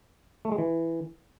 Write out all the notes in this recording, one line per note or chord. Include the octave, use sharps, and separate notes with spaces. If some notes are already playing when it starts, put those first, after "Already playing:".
A3
G#3
E3